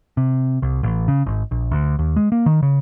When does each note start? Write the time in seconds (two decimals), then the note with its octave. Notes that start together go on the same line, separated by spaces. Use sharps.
0.17 C3
0.62 C2
0.83 A1
1.08 C#3
1.26 G#1
1.51 A#1
1.71 D2
1.99 D#2
2.16 G#3
2.32 A#3
2.46 D#3
2.62 C#3